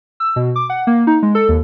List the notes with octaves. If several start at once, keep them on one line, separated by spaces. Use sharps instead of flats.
E6
B2
D6
F#5
A#3
D#4
G#3
A4
D#2